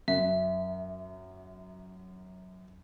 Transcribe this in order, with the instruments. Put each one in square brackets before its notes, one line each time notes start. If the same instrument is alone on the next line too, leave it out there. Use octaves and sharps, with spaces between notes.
[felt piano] F#2 [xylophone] E5